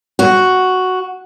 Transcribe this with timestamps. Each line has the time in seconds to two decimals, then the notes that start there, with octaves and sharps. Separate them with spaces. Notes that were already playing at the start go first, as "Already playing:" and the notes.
0.19 F#4